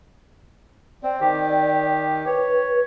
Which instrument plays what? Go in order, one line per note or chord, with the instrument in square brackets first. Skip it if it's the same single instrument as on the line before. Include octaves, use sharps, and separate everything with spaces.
[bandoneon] C4 [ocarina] D5
[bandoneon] D#3 G4
[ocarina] B4 [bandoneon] C#5